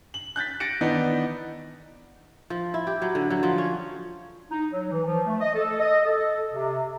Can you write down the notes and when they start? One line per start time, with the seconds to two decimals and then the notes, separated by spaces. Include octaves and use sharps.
0.14 F#7
0.36 F#6 G6 A6 B6
0.60 A6 A#6 C#7 D7
0.81 D#3 E3 B3 D4 D#4
2.50 F3
2.74 E4
2.87 G4
3.02 F#3
3.15 D3
3.30 F#3
3.43 F3
3.58 C#4
4.51 D#4
4.71 F#3
4.91 E3
5.06 F3
5.26 A3
5.41 D#5
5.55 A4
5.80 D#5
6.05 A4
6.54 C3